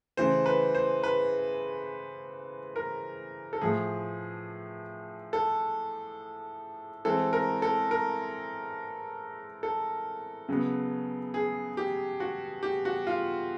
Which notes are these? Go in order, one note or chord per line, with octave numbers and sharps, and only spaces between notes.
C#3 E3 A3 C5
B4
C5
B4
A#4
A4
A2 F3 A3 G#4
A4
E3 G#3 C4 A4
A#4
A4
A#4
A4
C#3 F#3 B3
G#4
G4
F#4
G4
F#4
F4